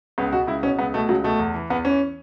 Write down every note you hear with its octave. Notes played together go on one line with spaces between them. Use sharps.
C#2 B3
B2 F#4
C#2 E4
B2 C#4
C#2 B3
B2 A3
C#2 F#3
B2 A3
E2
E3
E2 B3
E3 C#4